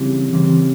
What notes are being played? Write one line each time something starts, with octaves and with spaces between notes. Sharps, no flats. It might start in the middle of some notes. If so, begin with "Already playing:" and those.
Already playing: C#3 E3 G3 C4
C#3 E3 G3 C4